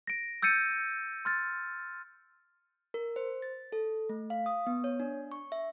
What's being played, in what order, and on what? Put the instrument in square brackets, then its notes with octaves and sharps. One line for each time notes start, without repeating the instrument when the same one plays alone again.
[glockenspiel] A#6 D7
E6 G6 A6 C#7 D#7
C6 F6 A6
[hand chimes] A#4
C5
A6
A4
A3
F5
D#6
B3
C#5
D4
C#6
E5